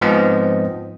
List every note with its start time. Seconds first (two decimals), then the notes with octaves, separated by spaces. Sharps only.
0.01 G#2 F3 B3 C4 D#5